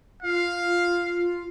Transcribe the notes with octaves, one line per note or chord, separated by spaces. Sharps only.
F4 F5